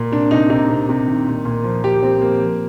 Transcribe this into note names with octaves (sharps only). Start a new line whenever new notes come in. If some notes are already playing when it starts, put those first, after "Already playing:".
Already playing: A#2
C3 D4
C3 D#4
C3 D#4
C3
C3
D#3
A#2
A#2
F3
F3 G4
F3 C4
F3 A#3
F3